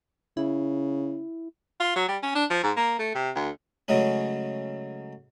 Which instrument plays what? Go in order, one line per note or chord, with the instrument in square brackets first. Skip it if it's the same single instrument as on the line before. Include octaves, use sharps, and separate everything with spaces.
[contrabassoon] C#3 [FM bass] E4
[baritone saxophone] F4
F#3
G3
C#4
D4
F3
G#2
A#3
A3
C3
D2
[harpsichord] C#3 F#3 G#3 A3 C#4